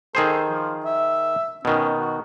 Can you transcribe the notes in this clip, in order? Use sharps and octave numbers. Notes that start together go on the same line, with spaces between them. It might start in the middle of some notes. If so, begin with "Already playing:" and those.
D#3 G#4 A4 C5
F3
E5
B2 D#3 C#4
F#4